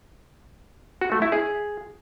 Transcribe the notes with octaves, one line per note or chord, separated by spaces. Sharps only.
F#4
A3
E4
G#4